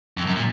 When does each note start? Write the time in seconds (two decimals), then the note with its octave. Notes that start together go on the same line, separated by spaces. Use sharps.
0.17 F2
0.27 F#2
0.36 A#2